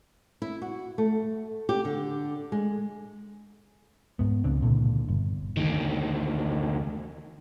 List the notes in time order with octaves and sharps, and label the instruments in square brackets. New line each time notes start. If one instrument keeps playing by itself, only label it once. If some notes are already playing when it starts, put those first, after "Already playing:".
[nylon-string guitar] E4
F#4
A3
G4
D3
G#3
[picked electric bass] G#2 B3
C#2 C4 D4
C#2 A#2 D3 E3
G1
[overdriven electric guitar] D2 D#3